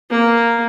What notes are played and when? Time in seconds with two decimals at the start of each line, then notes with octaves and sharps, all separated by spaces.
0.10 A#3